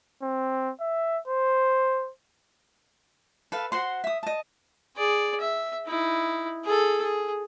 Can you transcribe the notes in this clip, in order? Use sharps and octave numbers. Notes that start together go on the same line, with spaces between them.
C4
E5
C5
A4 B4 F5
F#4 C5 F#5 C6
E5 D#6
D#5 A5
G#4 D5
E5
D#4 E4
G#4 A4
G#4